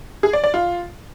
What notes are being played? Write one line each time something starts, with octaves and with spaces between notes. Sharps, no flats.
G#4
D5
D5
F4